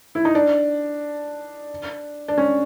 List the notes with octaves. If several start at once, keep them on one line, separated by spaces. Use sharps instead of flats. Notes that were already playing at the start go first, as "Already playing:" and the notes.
E4
D#4
D4
D4
C#4